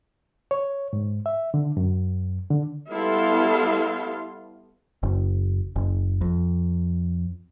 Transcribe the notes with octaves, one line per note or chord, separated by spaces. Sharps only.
C#5
G#2
E5
D3
F#2
D3
G3 B3 E4 A4 F5 C6
F#1
F#1
F2